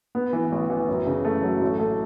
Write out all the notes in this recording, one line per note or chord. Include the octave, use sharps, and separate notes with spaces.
B3
E3
A1
E3
F#2
C#3
A3
F#3
A1
A3